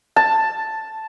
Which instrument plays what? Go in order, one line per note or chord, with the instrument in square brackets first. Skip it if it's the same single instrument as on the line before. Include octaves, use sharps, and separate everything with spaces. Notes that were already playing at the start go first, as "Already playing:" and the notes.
[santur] A5